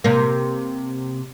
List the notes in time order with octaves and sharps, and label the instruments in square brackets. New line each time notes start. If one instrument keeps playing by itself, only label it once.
[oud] C3 A#3